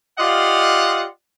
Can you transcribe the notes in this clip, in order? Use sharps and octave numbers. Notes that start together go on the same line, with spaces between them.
F4 G4 D5 D#5 F5 F#5